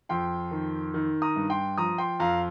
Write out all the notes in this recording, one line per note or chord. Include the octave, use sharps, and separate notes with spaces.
F2 G5 C6
D#3
D#3
A#5 D#6
G2
G5 C6
F3 A#5 D#6
G5 C6
F2 F5 A#5